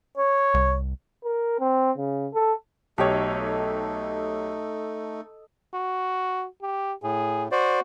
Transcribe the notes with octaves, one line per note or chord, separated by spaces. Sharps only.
C#5
C2
A#4
C4
C#3
A4
B1 A3 D#4 G4 A4 C#5 D#5
F#4
G4
A2 G#4
F#4 C5 D5